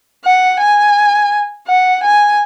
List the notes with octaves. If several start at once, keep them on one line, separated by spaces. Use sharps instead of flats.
F#5
G#5
F#5
G#5